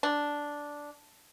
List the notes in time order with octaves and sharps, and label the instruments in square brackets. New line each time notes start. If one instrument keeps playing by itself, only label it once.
[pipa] D4